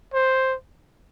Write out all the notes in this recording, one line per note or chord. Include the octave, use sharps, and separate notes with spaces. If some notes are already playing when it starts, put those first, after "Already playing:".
C5